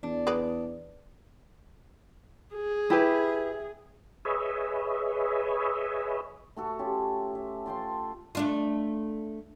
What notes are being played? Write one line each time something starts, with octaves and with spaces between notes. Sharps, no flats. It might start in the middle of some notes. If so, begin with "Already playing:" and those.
E2 D4
G#4 B4 D5
G#4
E4 G4 B4
G#4 B4 C#5 D#5 E5
A3 F#4 A4
C#4 F4 G4
E5
F4 G5 A5 C6
A3 D4 F4